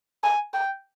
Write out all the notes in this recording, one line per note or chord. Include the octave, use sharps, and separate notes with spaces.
G#5
G5